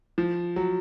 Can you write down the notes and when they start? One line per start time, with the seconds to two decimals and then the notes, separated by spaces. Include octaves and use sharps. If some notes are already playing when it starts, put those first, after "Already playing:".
0.18 F3
0.56 F#3